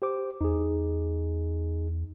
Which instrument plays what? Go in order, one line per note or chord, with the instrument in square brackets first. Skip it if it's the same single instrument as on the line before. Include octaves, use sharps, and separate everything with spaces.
[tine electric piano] G4 C5 D6
[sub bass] E2 [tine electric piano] D#4 G#4